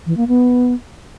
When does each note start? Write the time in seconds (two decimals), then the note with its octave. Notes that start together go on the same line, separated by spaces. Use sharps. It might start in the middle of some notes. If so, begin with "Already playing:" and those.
0.06 E3
0.17 A#3
0.28 B3